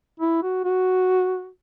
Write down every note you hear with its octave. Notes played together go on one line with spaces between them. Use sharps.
E4
F#4
F#4